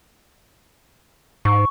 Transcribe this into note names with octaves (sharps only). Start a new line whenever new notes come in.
G#2 C#6